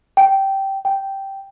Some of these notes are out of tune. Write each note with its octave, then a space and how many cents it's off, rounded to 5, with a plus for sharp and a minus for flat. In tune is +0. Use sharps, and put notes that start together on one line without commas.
G5 -10
G5 -5